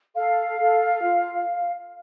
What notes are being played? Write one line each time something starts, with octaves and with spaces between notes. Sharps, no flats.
A4 F5
A4
F4